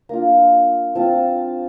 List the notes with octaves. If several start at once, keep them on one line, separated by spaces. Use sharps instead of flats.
A#3 D4 F4 A#5
F3 C4 F4 A5